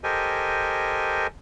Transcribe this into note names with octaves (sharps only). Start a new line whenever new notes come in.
G4 A4 A#4 C5 D#5 G#5